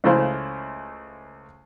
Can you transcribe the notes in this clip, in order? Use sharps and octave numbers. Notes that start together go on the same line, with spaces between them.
C#2 C#3 A3 E4 C5 F5